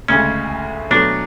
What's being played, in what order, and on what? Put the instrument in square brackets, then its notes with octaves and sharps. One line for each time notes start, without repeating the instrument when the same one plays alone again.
[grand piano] D2 C#3 G#3 [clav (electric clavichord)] C#4
[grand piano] B2 F#3 A3 [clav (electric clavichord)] D4